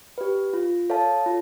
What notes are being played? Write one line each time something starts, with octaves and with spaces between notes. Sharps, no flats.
G4 B4
F4
A4 C#5 F5 A5
F4